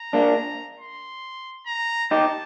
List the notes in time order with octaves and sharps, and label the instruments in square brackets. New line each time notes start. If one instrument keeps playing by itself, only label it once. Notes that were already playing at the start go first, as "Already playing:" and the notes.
Already playing: [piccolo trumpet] A#5
[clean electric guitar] A#3 D4
[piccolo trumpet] C6
A#5
[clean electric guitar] D#4 G4 [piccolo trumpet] A5